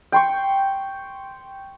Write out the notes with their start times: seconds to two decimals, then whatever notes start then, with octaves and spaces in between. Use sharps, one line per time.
0.12 G5 C6 C#6